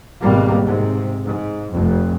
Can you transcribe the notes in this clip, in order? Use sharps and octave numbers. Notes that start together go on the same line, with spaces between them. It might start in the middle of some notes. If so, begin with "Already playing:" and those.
G#1 B2 G3 A#3
G#2 C3
G#2
F1 F2